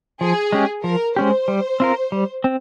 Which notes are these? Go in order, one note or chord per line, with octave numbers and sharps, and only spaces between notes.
F3 G#4
G#3 C#4 G4
F3 A#4
G#3 C#4 G4 C5
G3
C4 F4 A#4
G3
C4